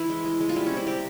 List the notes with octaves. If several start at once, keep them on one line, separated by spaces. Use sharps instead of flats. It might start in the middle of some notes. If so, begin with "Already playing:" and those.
Already playing: E3 E4
G#3
G#3
G#3
F4
G3 E4
C3 C#4
E4
C3 G4